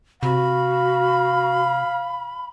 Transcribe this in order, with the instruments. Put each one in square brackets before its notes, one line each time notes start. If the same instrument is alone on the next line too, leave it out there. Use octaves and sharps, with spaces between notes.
[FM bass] C3 [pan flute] F#4 [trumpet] F5 [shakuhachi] B5